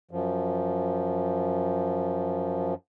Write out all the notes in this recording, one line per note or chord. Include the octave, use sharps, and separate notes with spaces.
F#2 F3